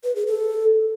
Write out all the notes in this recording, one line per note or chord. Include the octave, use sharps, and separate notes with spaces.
B4
G#4
A4